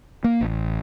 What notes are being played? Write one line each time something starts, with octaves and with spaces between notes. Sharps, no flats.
A#3
A1